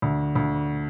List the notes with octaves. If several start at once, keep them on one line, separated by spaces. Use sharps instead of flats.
D2
D2